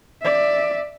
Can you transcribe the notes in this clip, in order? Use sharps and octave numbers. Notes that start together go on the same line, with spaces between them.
D5 E5